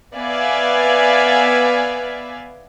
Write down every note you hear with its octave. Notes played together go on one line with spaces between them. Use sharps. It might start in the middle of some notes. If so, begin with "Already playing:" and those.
B3 B4 D5 E5 F5 G#5